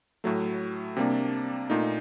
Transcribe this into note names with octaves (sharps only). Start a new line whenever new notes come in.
A2 F#3 A3
C3 G3 A#3 D4
A#2 A3 D#4